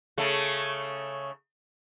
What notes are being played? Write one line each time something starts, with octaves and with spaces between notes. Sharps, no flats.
C#3 A3